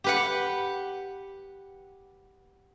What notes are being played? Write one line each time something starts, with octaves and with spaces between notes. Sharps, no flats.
G4 B4 F#5